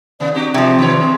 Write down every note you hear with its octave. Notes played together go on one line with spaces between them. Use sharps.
D#2 C3 B3 D5
C4 D4 F#4 G4
C3 F3 G#3
D#3 B3 C#5
C4 G#4